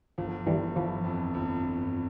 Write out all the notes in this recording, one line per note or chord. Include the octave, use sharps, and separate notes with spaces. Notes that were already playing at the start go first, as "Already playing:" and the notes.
G1 F3
G1 E3 G3
E3 F3
F2
G1
G1